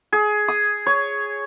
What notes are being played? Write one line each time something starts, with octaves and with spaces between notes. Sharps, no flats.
G#4
D#6
C#5